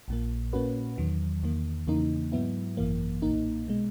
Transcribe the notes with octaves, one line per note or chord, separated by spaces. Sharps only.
A#1 A#2 A#3
A#2 A#3 C#4 F#4 B4
E2 D#3 F#3
E2 D#3 A#3
E2 C#3 E3 A#3 D#4
G#2 F#3 B3 E4
G#1 F#2 E3 A#3
B1 A#2 A#3 D#4
B2 G#3